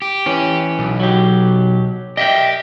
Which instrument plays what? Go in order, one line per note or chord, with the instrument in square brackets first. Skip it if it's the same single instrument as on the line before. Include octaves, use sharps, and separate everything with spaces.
[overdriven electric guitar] G4
[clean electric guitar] E3 C#4
[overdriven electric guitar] B1
[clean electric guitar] F#3 G4
[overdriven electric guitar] G4 [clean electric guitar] D#5 E5 G5